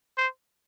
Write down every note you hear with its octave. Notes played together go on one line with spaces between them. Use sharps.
C5